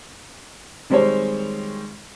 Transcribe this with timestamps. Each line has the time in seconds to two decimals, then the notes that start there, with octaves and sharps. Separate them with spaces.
0.90 D#3 G3 G#3 C4 C5 C#5